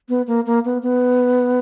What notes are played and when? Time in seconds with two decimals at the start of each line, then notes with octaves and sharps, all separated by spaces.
0.09 B3
0.27 A#3
0.46 A#3
0.65 B3
0.83 B3